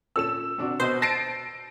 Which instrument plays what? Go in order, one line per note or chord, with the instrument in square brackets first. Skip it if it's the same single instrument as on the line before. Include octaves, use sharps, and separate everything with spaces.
[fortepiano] A#2 C#4 A4 [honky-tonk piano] E6 E7
[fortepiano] C3 D4 F#4
[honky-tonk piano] B2 [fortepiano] B4 D#5 D#6 [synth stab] C5
[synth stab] A5 [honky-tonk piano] A#6 C7 D7